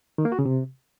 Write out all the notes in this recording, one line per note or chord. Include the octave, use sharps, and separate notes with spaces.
D#3
A#3
F#4
C#3
C3